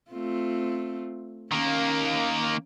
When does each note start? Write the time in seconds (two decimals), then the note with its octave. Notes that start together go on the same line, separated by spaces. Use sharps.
0.11 A3 C4 F4
1.52 D#3 A#3 C#4